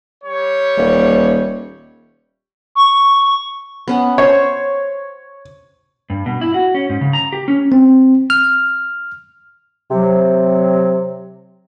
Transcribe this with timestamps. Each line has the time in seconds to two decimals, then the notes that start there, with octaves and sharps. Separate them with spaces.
0.24 G3 C#5
0.77 D#1
2.75 C#6
3.88 B3 C#4 F#5
4.18 C5 C#5
6.10 G2
6.26 B2
6.41 E4
6.54 F#4
6.74 C#4
6.90 G#2
7.01 C#3
7.13 A#5
7.33 G4
7.48 C#4
7.72 C4
8.30 F6
9.91 C3 F#3